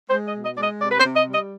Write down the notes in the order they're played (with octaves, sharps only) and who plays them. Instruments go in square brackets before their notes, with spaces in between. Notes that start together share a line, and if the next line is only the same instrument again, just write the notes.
[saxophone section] G#3 C5
D#5
B2
D#5
G#3 D5
D#5
C3 D5
B4
C5
C3
D#5
G3
D#5